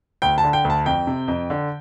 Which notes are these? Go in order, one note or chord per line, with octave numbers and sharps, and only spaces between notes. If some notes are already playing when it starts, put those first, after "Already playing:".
D2 G5
A5
D3
G5
D2
A5
F2 G5
C3
F2
D3